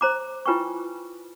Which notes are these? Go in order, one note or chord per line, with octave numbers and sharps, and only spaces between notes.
C5 A#5 D6
E4 F4 B4 G5 G#5 C#6